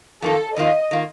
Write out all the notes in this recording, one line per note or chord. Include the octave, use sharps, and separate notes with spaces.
F2 D#3 A#3 F4 A4
F2 D#3 A#3 F4 D#5
D#3 A#3 F4